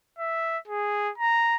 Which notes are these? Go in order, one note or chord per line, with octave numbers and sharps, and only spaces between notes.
E5
G#4
A#5